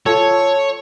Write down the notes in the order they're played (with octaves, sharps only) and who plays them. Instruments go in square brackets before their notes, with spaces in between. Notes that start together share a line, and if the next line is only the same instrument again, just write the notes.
[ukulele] F4 A4 [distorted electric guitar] C#5